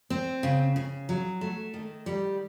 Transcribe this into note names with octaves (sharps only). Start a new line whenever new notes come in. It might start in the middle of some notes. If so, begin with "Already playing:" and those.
C4
C#3
C#3
F#3
A3
D#3
G3